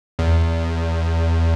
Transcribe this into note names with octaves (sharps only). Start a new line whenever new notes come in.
E2